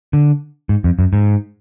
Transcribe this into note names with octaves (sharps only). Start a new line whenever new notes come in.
D3
G#2
F2
F#2
G#2